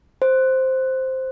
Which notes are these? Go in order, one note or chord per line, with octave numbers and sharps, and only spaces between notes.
C5